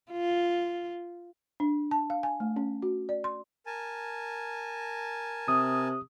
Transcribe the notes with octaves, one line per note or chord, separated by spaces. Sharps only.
F4
D4
A5
F5
G#5
A3
C#4
F#4
D5
C6
A#4 G#5 A5
C3 D#6